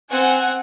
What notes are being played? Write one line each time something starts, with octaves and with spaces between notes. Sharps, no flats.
C4 F#5 G#5